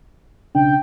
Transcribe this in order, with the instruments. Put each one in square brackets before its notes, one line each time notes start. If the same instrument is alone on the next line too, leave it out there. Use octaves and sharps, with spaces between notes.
[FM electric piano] B1 C#3 D4 [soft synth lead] G5